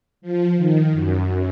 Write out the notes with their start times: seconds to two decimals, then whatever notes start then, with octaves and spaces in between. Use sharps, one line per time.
0.22 F3
0.56 D#3
0.92 F#2